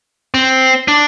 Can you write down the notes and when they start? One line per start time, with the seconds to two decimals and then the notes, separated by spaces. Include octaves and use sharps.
0.34 C4
0.88 D4